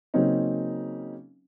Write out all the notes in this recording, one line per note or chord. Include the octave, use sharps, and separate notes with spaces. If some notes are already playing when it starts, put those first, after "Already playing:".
C#3 F#3 A#3 C4 C#4 D#4